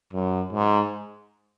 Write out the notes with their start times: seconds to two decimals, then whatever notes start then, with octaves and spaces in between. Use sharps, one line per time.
0.13 F#2
0.53 G#2